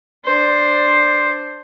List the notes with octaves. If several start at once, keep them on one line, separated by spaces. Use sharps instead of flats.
D4 C5